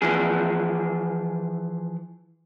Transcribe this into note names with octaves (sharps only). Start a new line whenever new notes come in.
E3 F3 G#4